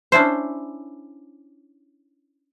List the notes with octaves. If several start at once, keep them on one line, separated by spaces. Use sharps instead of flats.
C#4 D4 E4 C5